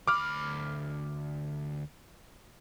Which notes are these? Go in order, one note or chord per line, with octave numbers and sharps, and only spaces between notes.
D2 B5 D6 F6